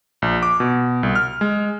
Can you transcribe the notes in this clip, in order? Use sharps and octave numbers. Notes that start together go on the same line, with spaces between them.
A#1
D6
B2
C2
F6
G#3